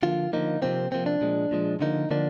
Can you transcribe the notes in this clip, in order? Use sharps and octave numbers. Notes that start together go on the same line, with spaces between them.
D3 F3 A#3 F4
D3 F3 A#3 D#4
C3 F3 A#3 C4
C3 F3 A#3 C4
D4
A#2 F3 G#3
A#2 F3 G#3
D3 F3 A#3 D#4
D3 F3 A#3 D4